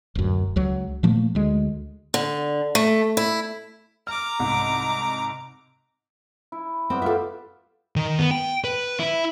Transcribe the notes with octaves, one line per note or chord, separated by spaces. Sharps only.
D1 F#2
C#2 F#3
A#2 F3 A3 A#3
D2 G#3
D3
A3
E4
A#5 D6 F6
C2 G#2
E4
G3 B3 C4
E4 F4 G4 A4 E5
D#3
B3
G5
B4
E4